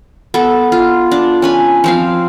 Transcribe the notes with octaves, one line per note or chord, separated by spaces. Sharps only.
B3 A4
F4
D4
C#4 B4 G#5
F3 C4 F5